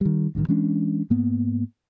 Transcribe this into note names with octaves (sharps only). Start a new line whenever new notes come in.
D#3 G3
A1 G2 C3 D#3
E3 G#3 C#4 D4
G#2 A#3 B3